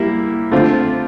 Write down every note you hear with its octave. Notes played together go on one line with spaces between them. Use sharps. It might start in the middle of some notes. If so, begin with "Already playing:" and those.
Already playing: G3 A#3 E4
D3 A3 C4 F4